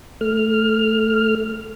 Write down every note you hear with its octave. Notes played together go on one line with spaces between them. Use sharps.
A3 F6